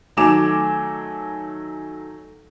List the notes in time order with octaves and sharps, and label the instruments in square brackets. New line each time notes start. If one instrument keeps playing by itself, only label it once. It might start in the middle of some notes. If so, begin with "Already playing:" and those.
[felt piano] D#3 F#3 A3 G#5 D6 E7